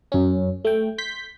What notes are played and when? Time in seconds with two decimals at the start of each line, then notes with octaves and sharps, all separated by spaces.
0.12 F#2 C#4
0.65 A3 G5
0.98 C6 G6 B6